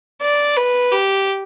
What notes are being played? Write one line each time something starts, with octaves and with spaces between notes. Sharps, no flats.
D5
B4
G4